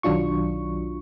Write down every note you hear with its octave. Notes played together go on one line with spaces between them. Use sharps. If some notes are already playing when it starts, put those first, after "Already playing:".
B1 D#3 F#3 D4 F4 C#6